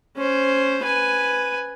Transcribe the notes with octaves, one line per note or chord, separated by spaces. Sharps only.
C#4 C5
B4 G#5